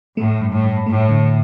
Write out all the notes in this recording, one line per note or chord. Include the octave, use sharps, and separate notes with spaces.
A2 A3
G2
A2
G2
A2 A3
D3